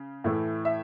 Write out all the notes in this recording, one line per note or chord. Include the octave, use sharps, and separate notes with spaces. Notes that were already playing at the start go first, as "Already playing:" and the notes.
Already playing: C#3
A2 E3 A3 E4
E5